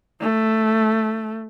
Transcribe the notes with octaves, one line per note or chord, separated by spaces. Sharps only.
A3